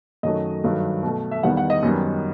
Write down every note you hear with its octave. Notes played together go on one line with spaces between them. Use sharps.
F#2 D#3 F#3 A3 D#5
G2 D#3 F#3 A3
B2 A3
E5
E2 D#3 G3 B3 F#5
F#5
D#5
F#2 D#3 G3 B3